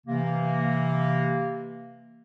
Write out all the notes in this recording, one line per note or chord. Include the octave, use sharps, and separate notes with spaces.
C3 E3 A#3